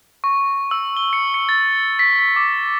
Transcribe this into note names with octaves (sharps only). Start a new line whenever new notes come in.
C#6
E6
G7
C#7
C#7
A6
B6
B6
D6